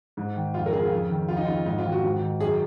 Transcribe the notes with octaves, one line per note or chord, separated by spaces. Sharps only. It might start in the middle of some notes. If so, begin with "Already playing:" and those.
G#2
D#3
F2 F4
A#4
C#3 G#4
F4
F2
D#3
F2 F4
D#4
F4
C#3
G#2 D#4
F4
D#3
F#4
G#2
D#3
F#2 G#4